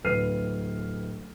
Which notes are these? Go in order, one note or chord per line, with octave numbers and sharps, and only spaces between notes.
D1 B4 F6 C7 D#7